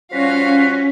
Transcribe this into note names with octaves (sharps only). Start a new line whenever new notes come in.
F3 G3 C#4 F#4 C#5 F5 B6